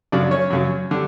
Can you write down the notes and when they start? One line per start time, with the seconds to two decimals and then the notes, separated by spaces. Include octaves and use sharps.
0.12 F#2 C#3 F#3 D4 D5
0.31 C#4 C#5
0.50 F#2 C#3 F#3
0.91 D3 G3